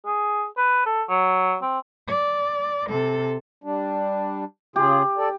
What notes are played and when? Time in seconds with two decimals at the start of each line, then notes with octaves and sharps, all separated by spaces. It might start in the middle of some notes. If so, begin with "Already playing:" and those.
0.06 G#4
0.57 B4
0.86 A4
1.09 F#3
1.62 C4
2.07 D5
2.89 C3 A4
3.64 G3 D4
4.76 C#3 F4 G4 G#4
5.18 A4 D5